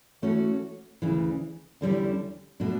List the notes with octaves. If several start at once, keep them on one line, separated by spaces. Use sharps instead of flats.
E3 A3 C#4 F#4 C#5
D2 C#3 E3
E2 D3 G3 C#4 E4
B2 A3 D4